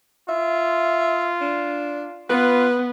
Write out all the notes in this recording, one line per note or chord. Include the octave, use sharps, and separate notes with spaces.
F4 E5
D4
B3 F4 B4